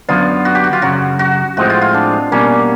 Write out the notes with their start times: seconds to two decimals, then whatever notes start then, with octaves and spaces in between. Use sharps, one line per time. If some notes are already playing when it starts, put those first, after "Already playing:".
0.09 F#2 D3 F#3 B3 F4
0.45 F#4
0.55 G4
0.64 F#4
0.73 F4
0.82 F#2 C#3 F#3 F#4
1.19 F#4
1.57 A2 F3 G#3 C4 F#4
1.70 F4
1.82 F4
1.94 D4
2.32 B2 G3 A#3 C#4